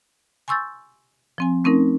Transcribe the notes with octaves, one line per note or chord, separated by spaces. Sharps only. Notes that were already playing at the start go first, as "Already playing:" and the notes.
G#5 C6 C#6 E6 G6 A6
F3 C4 G#5
A3 C4 C#4 D#4 A#4